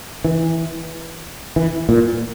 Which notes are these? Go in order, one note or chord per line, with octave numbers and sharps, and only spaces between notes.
E3
E3
A#2